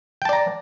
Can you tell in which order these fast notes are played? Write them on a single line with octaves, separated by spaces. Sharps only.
G5 A5 D5 A#5